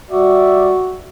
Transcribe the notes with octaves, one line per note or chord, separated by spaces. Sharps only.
G3 F#4 D5 E5